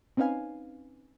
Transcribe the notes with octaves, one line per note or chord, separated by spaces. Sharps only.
C4 C#4 D#4 B4 F5 G#5